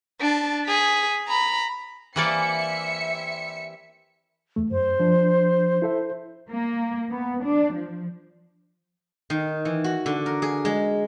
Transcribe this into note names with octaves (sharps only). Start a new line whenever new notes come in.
D4 A5
G#4 B6
A#5 B5
E3 G3 A#3 C4 D5 E5 G#5 C#7
E2 A3
F#2 C5
F3 D4
E4 A4 E5
A#3
B3
D4
F3
D#3
E3
F#4
D3
A#4
G#4
G#3